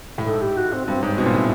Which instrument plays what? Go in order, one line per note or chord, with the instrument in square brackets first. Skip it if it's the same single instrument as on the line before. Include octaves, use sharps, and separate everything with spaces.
[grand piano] A2
[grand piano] G#2 [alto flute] A4
[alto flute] G4
F#4
C4
[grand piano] G2 [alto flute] C4
[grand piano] G#2 [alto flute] C#4
[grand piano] B2 [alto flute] C4
[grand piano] A#2
A2